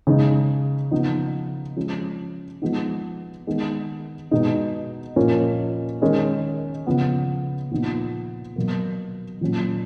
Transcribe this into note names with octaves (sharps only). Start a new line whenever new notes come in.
C#3 G#3 D#4
C#3 F3 B3 D#4
F3 G#3 C#4
F3 G#3 B3 D#4
D#3 G#3 B3 D#4
B2 G#3 D#4
A#2 F3 A#3 C#4
D#3 G#3 C#4
C#3 F3 B3
A#2 F3 B3 D#4
B2 F#3 A#3
A#2 F#3 C#4